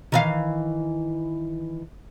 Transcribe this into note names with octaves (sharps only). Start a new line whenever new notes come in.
D#3 E3 F5